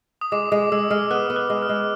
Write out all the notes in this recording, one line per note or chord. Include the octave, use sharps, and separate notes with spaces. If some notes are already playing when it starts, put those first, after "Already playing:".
D#6
G#3 D6
G#3 D#6
G#3 E6
G#3 F6
B3 F#6
B3
F#6
G#3
F6
G#3